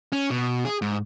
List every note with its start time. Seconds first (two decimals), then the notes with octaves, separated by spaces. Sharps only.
0.12 C#4
0.30 B2
0.65 G#4
0.82 G#2